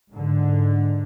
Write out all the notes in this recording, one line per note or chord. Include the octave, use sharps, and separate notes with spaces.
G#2 D3